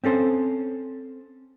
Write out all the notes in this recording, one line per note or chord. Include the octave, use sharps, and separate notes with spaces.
C4 C#4 A4 C5